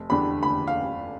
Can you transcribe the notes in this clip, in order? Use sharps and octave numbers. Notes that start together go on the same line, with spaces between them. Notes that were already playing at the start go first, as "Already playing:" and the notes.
Already playing: F1
E2 D3 G3 D4 B5
F1 B5
F5